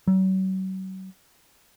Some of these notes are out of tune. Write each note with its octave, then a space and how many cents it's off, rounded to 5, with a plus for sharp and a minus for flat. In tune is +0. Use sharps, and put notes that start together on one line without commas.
F#3 +40